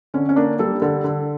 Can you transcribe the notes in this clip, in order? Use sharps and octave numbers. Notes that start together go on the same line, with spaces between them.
D3 C#4
C#4
A#3 D4
G3 A4
D3 A4
D3